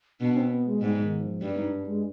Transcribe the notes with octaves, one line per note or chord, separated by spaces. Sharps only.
B2 D4
C4
B3
G#3
G#2 G3
D#3
F3
G2 G3
D#4
D4
G#3